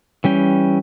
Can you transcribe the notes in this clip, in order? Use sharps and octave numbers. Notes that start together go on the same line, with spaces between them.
E3 G3 C#4 G5